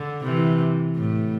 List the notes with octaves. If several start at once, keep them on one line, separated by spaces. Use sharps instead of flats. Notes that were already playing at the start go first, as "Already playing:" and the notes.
Already playing: D3
C3 E3
A2